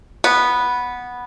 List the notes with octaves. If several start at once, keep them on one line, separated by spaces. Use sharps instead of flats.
B3